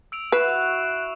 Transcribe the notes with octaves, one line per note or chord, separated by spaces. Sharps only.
E6 D7 F7
E4 F#4 B4 C#6 F#6 C7 E7